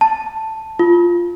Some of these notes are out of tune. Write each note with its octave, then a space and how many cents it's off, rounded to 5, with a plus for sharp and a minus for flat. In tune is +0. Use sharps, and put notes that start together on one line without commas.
A5 +5
F4 -5